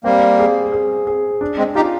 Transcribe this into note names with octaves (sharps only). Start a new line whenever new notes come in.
G3 A#3 C4
G#4
G#4
G#4
D4
G#3 C4
D#4 F4 G4